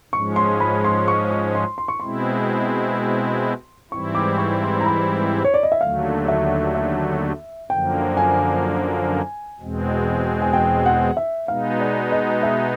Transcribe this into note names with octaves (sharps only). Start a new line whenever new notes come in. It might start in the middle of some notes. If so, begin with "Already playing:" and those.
G#2 F3 G#3 C#4 C#6
C6
B5
C6
C#6
C#6
C6
C6
C#6
B2 G#3 C4 E4 C6
G#2 E3 G3 C4 E4 C#6
D6
C#6
C6
A#5
B5
C#5
D5
D#5
E5
D#2 D3 F#3 A3 F5
E5
E5
F#2 D3 F3 A#3 G5
G#5
E2 B2 G#3 C4
G#5
G5
F#5
E5
B2 G#3 B3 D#4 F5
D5
D#5
E5